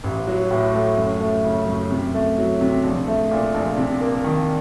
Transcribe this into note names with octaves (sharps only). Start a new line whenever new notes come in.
A1
F#3
A2
A3
F#2
A3
C#3
F#2
C3
A3
F#3
C3
A#1
A3
A#2
A#1
C3
A#3
D#3